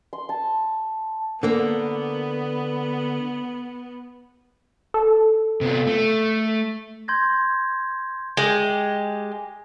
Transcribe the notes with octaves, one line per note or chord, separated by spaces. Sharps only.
C6
A5
D3 A#3 B3
A4
C3 B3 F4
A3
C6 G6 G#6 A#6
G#3 G4